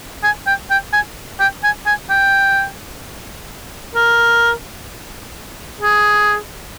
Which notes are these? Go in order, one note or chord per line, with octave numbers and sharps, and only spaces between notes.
G#5
G5
G5
G#5
G5
G#5
G#5
G5
A#4
G#4